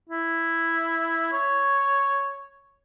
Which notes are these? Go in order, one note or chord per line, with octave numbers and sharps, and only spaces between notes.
E4
C#5